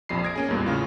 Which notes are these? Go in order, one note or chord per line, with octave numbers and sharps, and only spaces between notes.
A#1 F2 C3 B5 C7
D#6 G#6 A#6 D7
A#3 C#4 G#4
A1 E2 G2 A#2
A2 C#3 F4